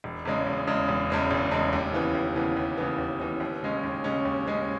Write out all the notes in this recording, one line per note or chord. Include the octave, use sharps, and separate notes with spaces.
E1
E2 C#3 G#3
E1
E2 C#3 G#3
E1
E2 C#3 G#3
E1
E2 C#3 G#3
D#2
C#3 E3 B3
D#2
C#3 E3 B3
D#2
C#3 E3 B3
D#2
C#3 E3 B3
D#2
C#3 G#3 C#4
D#2
C#3 G#3 C#4
D#2
C#3 G#3 C#4